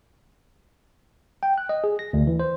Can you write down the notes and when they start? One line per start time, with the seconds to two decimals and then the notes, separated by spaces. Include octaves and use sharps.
1.43 G5
1.58 F#6
1.69 D#5
1.84 G#4
1.99 A#6
2.13 D2
2.27 E3
2.40 C5